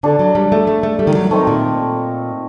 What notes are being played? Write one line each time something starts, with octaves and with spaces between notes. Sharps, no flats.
D3 D4 A4 D5
F#3
G3
A3
A3
A3
G3
D#3
F#3
D#3 A3 C4 D#4
A#2